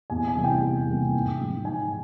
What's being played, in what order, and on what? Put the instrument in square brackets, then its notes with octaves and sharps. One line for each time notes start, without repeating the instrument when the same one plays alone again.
[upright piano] E2 G#5
G#5
C3 E3 G3 A#3
G5
E2
C3 E3 G3 A#3
G#2
F3 G#3
G#2 G#5